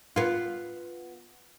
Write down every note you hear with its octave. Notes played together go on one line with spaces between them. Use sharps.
B3 F4